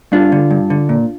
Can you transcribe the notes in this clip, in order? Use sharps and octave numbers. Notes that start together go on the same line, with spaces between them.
G2 D4 F4
D3
G2
D3
A#2